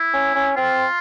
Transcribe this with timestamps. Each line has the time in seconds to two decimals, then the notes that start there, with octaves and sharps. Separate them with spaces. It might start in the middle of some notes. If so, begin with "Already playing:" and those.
Already playing: E4
0.14 C#4
0.35 C#4
0.56 C4 F4